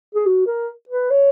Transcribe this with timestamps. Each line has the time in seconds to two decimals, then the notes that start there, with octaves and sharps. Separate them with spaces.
0.15 G#4
0.26 F#4
0.47 A#4
0.89 B4
1.11 C#5